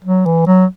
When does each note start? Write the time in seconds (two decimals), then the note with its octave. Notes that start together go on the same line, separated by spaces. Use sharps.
0.04 F#3
0.25 E3
0.47 F#3